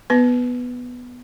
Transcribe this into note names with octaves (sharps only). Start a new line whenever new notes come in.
B3 B4